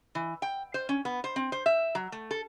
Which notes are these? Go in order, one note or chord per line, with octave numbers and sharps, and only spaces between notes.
E3
G5
C5
C#4
B3
C5
C4
C5
E5
F#3
A3
A4